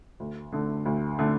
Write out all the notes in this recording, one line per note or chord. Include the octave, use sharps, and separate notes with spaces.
D2
D3 A3
D2
D3 A3